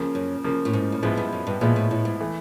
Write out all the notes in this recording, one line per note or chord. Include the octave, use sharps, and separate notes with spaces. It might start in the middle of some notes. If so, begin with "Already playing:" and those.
Already playing: C#3 F3 A#3
F#2
C#3 F3 A#3
A2
G#2
A2
G#2 F3 G#3 B3 E4
G2
F#2
G2
A#2 F3 G#3 B3 E4
A2
A2
G#2
E3 A3